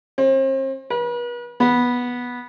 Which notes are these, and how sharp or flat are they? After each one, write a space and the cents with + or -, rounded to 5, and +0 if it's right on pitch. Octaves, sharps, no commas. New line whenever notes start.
C4 +40
B4 -40
B3 -10